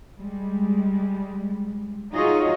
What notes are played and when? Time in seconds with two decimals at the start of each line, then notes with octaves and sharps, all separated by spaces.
0.20 G3 G#3
2.14 D#4 F4 F#4 G#4 C#5 D#5